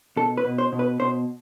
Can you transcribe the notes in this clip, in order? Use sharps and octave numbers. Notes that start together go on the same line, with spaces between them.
B2 A4
B4
B2
C5
B2
B4
B2 C5